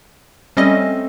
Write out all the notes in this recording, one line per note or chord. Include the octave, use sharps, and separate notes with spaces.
G3 A3 C4 C#4 D#5